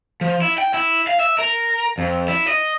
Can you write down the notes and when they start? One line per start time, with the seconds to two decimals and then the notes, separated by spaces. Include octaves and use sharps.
0.21 F3
0.42 E4
0.58 G5
0.74 E4
1.07 F5
1.20 E5
1.39 A#4
1.98 F2
2.28 E4
2.47 D#5